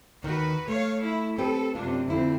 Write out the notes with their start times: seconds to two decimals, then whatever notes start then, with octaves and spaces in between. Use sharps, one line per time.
0.23 D#2 D#3 F#4 B4
0.68 A3 C#5 F5
1.02 E4
1.38 C4 G4 A4 B4
1.75 F#2 C3 D4 F4
2.08 F2 D3 C4 E4 F4